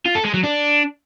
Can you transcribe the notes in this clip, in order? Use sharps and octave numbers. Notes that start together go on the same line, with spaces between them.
F4
A4
G#3
F#3
D4